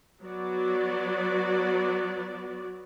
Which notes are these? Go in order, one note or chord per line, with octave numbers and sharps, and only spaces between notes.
F#3 B3 F#4 D5